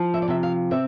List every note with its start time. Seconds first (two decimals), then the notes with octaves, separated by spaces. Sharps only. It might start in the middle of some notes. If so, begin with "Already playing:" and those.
Already playing: F3
0.14 E5
0.22 D5
0.28 C3 E5
0.43 F5
0.71 C4 E5